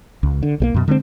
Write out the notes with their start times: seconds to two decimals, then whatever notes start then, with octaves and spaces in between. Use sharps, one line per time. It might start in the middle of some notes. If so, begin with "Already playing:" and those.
0.23 C#2
0.43 D3
0.60 B1 G3 A#3
0.74 F#2 B2
0.88 D3 G#3 A#3 C4